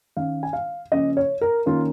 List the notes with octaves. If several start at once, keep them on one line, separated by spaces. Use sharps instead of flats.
D#3 C#4 F5
G#5
F5
C#3 F3 A#3 C#4 D#5
C#5
A#4
D#3 A#3 C#4 F4